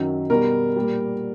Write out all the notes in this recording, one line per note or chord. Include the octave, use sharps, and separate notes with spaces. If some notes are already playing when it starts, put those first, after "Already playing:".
Already playing: F#2 D#3 F#3
B2 G3 A#4
A#2 G3